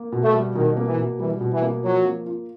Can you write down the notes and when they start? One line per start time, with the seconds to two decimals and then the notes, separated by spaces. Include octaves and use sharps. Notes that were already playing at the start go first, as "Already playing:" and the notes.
Already playing: A#3
0.12 B2
0.23 A3
0.34 G3
0.55 B2 D#3
0.77 A#3
0.87 E3
0.98 B2
1.19 E3 G3
1.41 B2
1.52 E3
1.62 A#3
1.83 F3 F#3
2.05 A#3
2.26 F4